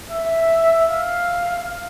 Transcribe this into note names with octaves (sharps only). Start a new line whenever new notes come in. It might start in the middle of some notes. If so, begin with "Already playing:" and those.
E5
F5